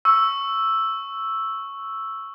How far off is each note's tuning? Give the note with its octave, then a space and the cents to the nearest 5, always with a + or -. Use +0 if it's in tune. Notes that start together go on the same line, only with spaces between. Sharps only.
C#6 +0 E6 +0